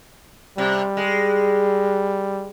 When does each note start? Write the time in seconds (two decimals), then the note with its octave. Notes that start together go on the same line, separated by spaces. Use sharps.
0.58 C3 G3
0.97 G#3